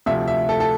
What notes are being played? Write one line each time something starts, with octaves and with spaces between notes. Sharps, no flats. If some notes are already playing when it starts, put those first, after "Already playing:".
D2 C3 F3 E5
E5
A4
A4